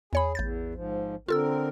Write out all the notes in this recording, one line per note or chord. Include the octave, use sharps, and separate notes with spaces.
E2 G#4 C#5 B5
A1 E2 G6 A6
G#2 F3
D3 C4 F4 A4 A#4 E6